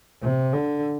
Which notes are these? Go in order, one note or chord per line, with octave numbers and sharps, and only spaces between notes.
C3
D3